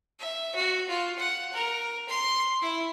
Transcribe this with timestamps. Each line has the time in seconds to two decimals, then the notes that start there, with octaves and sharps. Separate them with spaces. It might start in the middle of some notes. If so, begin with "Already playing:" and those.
0.19 E5
0.55 F#4
0.88 F4
1.19 F#5
1.53 A#4
2.09 C6
2.62 E4